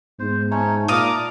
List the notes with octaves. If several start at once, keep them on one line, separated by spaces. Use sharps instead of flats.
G#2 B3 C5
C#4 D#4 C#5 E5 A5
A#2 D5 F5 A#5 D6 D#6